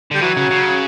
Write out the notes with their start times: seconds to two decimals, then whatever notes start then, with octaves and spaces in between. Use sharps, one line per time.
0.11 D3 G3
0.21 E3 F#3
0.37 C#3
0.51 C#3